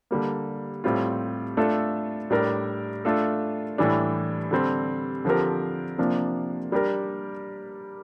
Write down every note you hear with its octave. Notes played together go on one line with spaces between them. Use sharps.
D3 G3 A#3
A2 G3 C4 F4
A3 D4 F4 A4
A2 G3 D4 G4 A#4
A3 D4 F4 A4
A2 E3 G3 D4
D3 G3 C4
D3 F3 C4 G4 A#4
C3 F3 A#3 D4
G3 D4 G4 A#4